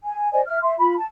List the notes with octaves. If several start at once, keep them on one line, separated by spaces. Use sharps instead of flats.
G#5
C5 D5 D#5 G#5
E5 F6
E5 C6
F4 B5
A5